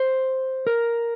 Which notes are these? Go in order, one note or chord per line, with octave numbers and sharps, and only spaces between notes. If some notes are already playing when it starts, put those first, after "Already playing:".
Already playing: C5
A#4